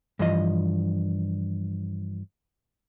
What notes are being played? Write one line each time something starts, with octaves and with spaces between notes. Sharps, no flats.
G2 E3 F3 D#5